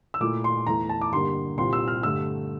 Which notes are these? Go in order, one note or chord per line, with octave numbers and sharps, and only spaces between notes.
E6
A#2 A3 E4 D6
C6
E2 E3 A3 A#5
A5
D6
G2 D3 G3 A#3 C6
C2 A#2 G3 C4 F4 C6
E6
F6
G2 D3 A3 E6